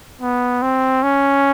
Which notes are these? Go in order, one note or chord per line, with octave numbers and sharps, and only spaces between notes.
B3
C4
C#4